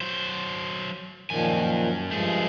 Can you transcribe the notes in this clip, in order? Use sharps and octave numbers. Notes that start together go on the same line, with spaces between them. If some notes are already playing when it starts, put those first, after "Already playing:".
F#3 C5
F#2 A#2 D#3 F3 G#5
G2 F3 G#3 A3 G#4